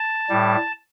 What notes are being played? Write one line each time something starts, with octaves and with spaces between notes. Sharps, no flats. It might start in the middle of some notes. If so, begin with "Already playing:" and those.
Already playing: A5
A2 G3